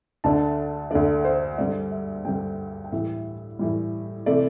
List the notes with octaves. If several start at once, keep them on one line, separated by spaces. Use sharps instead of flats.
D2 D3 A3 D4 A5
D2 D3 A3 D4 D5
C5
G2 D3 G3 D5
E5
G2 D3 G3 G5
G5
A2 E3 G3 E5
A2 E3 G3
C3 E3 A3 D5